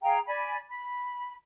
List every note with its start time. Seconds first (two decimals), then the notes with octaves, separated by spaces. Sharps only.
0.02 G#4 F5 G5 A#5
0.26 D5 G#5 B5
0.68 B5